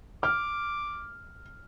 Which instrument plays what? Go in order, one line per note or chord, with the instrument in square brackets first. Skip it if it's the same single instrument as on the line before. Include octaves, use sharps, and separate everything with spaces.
[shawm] D6 [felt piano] F6